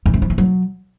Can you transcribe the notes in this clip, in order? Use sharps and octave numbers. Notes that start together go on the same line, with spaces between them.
F2
F#2
F3
E3
F#3